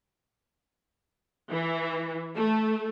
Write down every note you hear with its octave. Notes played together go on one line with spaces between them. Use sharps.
E3
A3